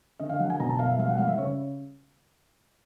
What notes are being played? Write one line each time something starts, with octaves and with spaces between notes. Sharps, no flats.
D3 D#5
F5
F#3 F#5
G#5
B2 A#5
A5
B2 F5
E5
G3 F5
F#5
G3 F5
E5
C#3 C#5